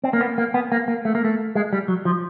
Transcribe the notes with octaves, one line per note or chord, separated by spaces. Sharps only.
C4
A#3
B3
A#3
B3
A#3
A#3
A3
A#3
A3
G#3
G3
F#3
F3